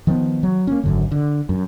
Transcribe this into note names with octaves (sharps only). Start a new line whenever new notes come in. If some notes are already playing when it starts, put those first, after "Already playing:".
D#3 F3 G3 B3
F#3
A#3 C4 C#4
G#1 F#2 D3
D3
F#2